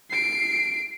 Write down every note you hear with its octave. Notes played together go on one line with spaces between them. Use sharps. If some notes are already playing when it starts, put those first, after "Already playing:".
C7 D7